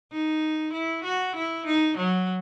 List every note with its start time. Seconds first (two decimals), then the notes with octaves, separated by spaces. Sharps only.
0.12 D#4
0.73 E4
1.04 F#4
1.36 E4
1.66 D#4
1.97 F#3